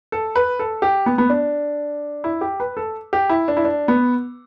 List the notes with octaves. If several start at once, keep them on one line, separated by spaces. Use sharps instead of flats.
A4
B4
A4
G4
B3
B3
D4
E4
G4
B4
A4
G4
E4
D4
E4
D4
B3